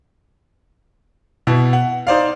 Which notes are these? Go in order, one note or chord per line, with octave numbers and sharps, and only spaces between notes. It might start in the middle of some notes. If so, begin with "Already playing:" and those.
B2 E4
F#5
D#4 C5 D5 F5